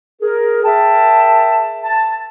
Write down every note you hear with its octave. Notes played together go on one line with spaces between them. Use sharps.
G#4 A#4
G#4 A#4 E5 G5 A5
A5